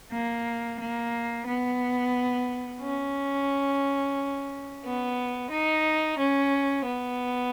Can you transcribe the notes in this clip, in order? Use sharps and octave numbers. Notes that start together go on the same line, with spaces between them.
A#3
A#3
B3
C#4
B3
D#4
C#4
B3